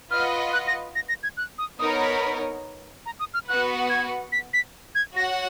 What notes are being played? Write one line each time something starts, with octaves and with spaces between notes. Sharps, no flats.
F4 B4 D#5 F#5 F6
F#6
A#6
A#6
A#6
G#6
F#6
D#6
B3 D#4 A#4 C#5 D#6
B5
A#5
D#6
F6
B3 F#4 B4 F#5 F#6
G#6
B6
B6
G#6
F#4 C#5 F#5 A#6